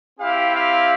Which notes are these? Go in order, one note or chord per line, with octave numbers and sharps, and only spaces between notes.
C4 E4 G4 F5
F5